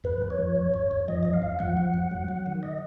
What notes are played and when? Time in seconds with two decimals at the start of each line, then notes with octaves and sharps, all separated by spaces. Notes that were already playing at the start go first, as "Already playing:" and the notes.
0.04 F2 B4
0.22 F2
0.30 C#5
0.39 F3
0.56 F2
0.74 F2
0.91 F2
1.08 F3 D#5
1.23 F2 D#5
1.33 F5
1.42 F2
1.59 F3 F#5
1.77 F3
1.94 F2
2.11 F#3
2.28 F#3
2.46 D#3
2.63 D#5